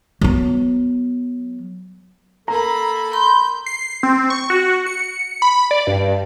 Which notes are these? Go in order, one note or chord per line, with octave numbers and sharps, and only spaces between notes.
F#3 B3
A#3 A4 A#5 B5
B5 C6 G6
C7
C4
C#6
F#4
C#7
B5
D5
G2